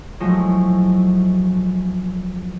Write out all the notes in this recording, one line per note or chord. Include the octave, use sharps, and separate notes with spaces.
F3 F#3 G#3 A3 E4